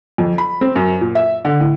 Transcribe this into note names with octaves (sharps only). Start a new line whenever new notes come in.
F2
B5
C4
F#2
A#2
E5
D3
A2